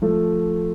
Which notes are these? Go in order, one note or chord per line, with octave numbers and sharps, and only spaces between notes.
F3 A3